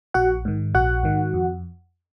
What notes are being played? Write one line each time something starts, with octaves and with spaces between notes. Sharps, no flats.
A#1 F#4 F#5
G#2 D#3
A#1 F#4 F#5
G#2 D#3
F2